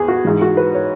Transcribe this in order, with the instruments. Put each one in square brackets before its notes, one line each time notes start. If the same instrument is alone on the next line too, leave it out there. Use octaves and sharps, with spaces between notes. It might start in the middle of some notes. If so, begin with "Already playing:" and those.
Already playing: [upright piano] E2 G#4 G#5
F#4
G#2 E3
F#4
B4
C#5